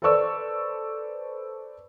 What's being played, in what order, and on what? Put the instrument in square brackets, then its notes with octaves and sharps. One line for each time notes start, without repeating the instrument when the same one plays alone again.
[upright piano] A4 B4 C5 D5 C#6 E6